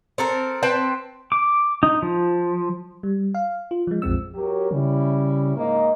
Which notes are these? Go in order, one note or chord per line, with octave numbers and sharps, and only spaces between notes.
C4 A4 A#4
C4 B4 G5 A5
D6
D#4
F3
G3
F5
F4
F3 G#3
A#1 F2 F3 G#3 C4 E6
F#3 G4 A#4
C#3 G3 C#4 E4
G#2 A#3 D#5